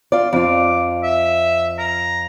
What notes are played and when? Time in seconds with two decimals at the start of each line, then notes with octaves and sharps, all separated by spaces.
0.12 F4 D5
0.33 F2 F4 D6
1.03 E5
1.79 A#5